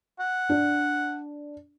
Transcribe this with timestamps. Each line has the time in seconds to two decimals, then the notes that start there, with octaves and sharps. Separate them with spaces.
0.20 F#5
0.49 D4